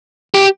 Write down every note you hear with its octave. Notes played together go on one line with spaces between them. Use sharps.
G4